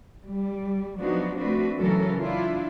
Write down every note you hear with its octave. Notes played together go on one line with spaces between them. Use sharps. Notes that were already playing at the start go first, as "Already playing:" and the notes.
G3
F3 F#3 B3 D4 D#4 F#4
A3 C4 D4 F#4 B4
C#3 E3 F#3 C#4 A4 A#4
D4 E4 F4